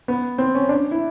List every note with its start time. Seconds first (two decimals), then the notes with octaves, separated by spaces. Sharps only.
0.08 B3
0.38 C4
0.55 C#4
0.69 D4
0.91 E4